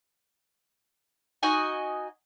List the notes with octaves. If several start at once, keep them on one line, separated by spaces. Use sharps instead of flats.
D#4 F#4 D#5 G#5